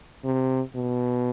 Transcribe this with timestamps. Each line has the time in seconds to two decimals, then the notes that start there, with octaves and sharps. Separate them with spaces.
0.25 C3
0.76 B2